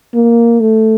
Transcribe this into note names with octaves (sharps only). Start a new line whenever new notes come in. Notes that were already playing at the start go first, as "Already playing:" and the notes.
A#3
A3